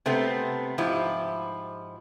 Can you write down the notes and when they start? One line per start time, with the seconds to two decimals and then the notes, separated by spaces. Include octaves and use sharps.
0.06 C3 A3 B3 C4
0.78 G#2 F3 E4 G4